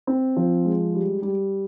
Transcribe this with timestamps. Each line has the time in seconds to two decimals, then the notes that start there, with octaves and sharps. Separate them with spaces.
0.07 C4
0.37 F3
0.65 G#3
0.95 G3
1.22 G3